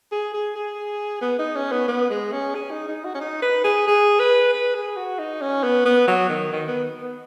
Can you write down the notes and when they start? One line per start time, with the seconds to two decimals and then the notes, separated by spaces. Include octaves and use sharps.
0.12 G#4
0.34 G#4
0.56 G#4
1.21 B3
1.39 D#4
1.56 C#4
1.72 B3
1.88 B3
2.10 G#3
2.32 C#4
2.55 G#4
2.70 D#4
2.88 D#4
3.04 F#4
3.15 C#4
3.21 D#4
3.42 B4
3.64 G#4
3.87 G#4
4.20 B4
4.53 B4
4.75 G#4
4.97 F#4
5.19 D#4
5.41 C#4
5.64 B3
5.85 B3
6.08 F#3
6.30 D#3
6.52 D#3
6.68 B3
7.01 B3